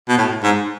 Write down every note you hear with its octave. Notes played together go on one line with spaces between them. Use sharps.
B2
A2
G#2